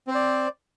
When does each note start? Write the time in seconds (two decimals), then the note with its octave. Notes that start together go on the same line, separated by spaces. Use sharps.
0.07 C4
0.11 C5
0.15 D5